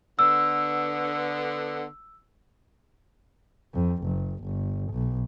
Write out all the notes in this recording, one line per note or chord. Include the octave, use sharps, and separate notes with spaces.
D3 B3 E6
F2
F#1
G1
B1